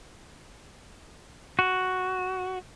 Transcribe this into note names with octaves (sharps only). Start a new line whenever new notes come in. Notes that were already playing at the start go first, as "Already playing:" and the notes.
F#4